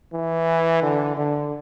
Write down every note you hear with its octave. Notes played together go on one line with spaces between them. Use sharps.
E3
D3
D3